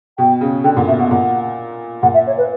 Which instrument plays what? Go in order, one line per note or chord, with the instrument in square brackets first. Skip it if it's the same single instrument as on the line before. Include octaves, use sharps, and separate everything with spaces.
[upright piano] B2 [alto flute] G5
[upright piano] C#3
[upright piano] D3 [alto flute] G5
[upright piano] A#2 [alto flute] F#5
[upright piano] B2 [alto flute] E5
[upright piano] B2 [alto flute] F#5
[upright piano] A#2 [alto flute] F#5
[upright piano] A#2 [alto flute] F#5
[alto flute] E5
C#5
B4